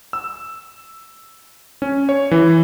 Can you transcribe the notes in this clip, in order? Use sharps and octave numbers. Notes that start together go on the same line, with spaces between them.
E6
C#4
C#5
E3